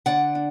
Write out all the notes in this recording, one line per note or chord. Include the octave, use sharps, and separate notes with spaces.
D3 D5 F#5
D4